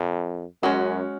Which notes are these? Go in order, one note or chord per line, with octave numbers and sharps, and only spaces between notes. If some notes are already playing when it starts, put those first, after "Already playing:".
Already playing: F2
F#2 G#3 C#4 F#4